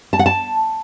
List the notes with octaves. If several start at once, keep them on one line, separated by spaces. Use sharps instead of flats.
A5
F#5
A5